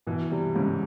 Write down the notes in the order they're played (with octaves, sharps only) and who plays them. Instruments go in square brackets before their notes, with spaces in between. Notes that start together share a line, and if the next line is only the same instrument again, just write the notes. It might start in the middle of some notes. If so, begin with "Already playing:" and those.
[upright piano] B2 [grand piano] E3
[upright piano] C3 [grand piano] G3
[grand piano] G#2 [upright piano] C#3